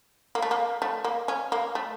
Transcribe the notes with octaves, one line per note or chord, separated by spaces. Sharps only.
A#3
A3
A#3
A3
A#3
C#4
A#3
A3